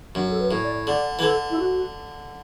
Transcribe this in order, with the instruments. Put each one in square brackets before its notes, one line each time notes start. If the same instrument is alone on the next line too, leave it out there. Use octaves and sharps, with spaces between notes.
[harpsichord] F#2 [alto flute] D4
[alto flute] A4
B4
[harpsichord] A2
[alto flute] D5
[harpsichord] D3 [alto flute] D5
[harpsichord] E3
[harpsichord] D3 [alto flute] A4
[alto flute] E4
F#4